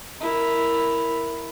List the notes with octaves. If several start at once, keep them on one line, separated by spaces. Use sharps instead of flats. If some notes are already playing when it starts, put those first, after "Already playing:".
E4 A#4